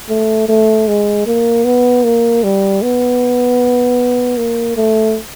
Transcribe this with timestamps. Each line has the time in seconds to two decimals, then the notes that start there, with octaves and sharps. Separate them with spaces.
0.09 A3
0.49 A3
0.88 G#3
1.26 A#3
1.65 B3
2.04 A#3
2.44 G3
2.82 B3
4.37 A#3
4.77 A3